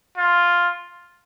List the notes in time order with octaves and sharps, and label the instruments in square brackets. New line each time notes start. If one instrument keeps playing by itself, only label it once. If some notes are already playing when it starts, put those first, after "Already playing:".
[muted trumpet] F4